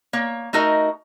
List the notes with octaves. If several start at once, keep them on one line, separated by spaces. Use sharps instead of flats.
A#3 C#5
A3 D#4 F#4 A#4 D#5